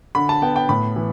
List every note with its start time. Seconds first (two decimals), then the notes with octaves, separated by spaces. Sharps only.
0.15 D3 B5
0.29 A5
0.42 B3 G5
0.56 G5
0.69 A2 B5
0.96 E3